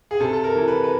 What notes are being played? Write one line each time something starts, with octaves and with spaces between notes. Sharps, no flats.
G#4
C3 A4
A4
A#4
E3
B4
B4